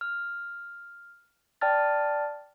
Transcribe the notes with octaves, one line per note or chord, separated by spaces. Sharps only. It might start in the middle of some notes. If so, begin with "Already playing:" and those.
F6
D5 G5 A5 F6 A6